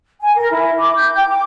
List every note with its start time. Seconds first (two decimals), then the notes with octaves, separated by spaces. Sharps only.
0.22 G#5
0.36 A#4
0.51 E4
0.78 D6
0.96 G6
1.15 G5
1.28 D6